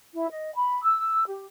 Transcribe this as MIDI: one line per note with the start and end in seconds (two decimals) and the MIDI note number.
0.14 0.27 64
0.30 0.54 75
0.55 0.83 83
0.84 1.23 88
1.28 1.45 67